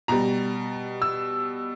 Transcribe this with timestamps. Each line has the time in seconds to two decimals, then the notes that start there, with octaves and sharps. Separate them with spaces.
0.08 B2 G3 A#5
1.02 E6